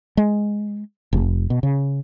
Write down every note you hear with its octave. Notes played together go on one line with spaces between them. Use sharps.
G#3
F1
B2
C#3